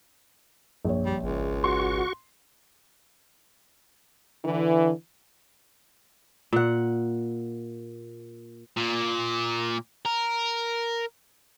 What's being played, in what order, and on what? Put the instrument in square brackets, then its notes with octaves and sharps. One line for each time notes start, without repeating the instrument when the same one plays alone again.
[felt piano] A#1 C#5 [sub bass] F#2
[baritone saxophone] G3
[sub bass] G#1 [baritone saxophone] C#2
[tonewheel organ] F#4 C#6 [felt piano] C6
[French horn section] D3 E3
[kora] A#2 F#5
[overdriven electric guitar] A#2
A#4